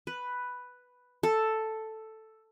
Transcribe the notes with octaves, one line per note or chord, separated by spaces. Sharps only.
B4
A4